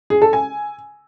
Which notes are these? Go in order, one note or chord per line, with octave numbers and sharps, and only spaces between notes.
G#4
A4
G#5